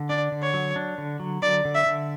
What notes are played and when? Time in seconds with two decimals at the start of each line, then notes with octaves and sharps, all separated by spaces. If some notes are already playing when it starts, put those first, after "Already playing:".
Already playing: D3
0.10 D4 D5
0.32 D3
0.43 C#5
0.54 F#3
0.76 D4
0.98 D3
1.20 F#3
1.42 D3 D5
1.65 D3
1.75 E5
1.86 D3